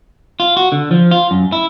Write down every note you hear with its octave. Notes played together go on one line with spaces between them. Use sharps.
F4
F#4
D3
F3
F4
F#2
E4